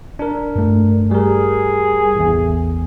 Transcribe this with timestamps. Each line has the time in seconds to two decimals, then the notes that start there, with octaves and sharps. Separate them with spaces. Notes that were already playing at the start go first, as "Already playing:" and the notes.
0.19 D4 A#4
0.56 G2 A3
1.11 G3 G#4 A#4
2.15 A1 E2